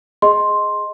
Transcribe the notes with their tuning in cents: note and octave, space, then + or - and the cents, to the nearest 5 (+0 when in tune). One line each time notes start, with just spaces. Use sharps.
G#4 +0 D#5 +0 C6 +5